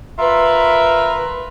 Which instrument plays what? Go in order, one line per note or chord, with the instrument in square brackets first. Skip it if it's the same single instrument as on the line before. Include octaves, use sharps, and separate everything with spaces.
[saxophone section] F4 A#4 B4 E5